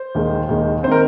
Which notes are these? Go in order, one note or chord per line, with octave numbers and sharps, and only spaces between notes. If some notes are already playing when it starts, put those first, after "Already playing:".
Already playing: C5
D#2 D#3 G#3
D#2 D#3 G#3
D#3 C4 C5
A#4